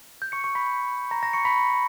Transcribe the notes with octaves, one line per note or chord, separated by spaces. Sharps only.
G6
C#6 C#7
C#6 C#7
B5 B6
A#5 A#6
A#5 A#6
C#6 C#7
B5 B6